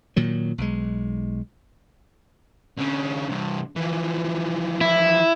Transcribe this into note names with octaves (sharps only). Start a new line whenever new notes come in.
A#2 D#3 F#3
B1 G#3
D3 C#4
G2 C3
E3 F3
E4